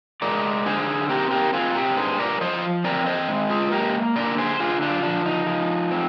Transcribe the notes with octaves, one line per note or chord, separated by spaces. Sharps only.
G#3 A#4 D5
D3 G#4 C5
C4 G4 A#4
G4 A#4
C4 F4 G#4
G4 A#4
G2 G#4 C5
A#4 D5
F3 C5 D#5
C4 A#4 D5
C5 D#5
G#3
F4 G#4
A#3 G4 A#4
D3 A#4 D5
G#4 C5
D3 F4 G#4
D4 F4
F3 D4
D#4
F3
C4